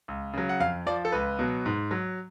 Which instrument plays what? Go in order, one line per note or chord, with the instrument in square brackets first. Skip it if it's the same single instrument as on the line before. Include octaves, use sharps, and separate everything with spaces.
[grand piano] C#2
C#3 F#3
F#5
F2 F5
F3 D5
A4
C#2 B4
B2 F#3
G#2
F#3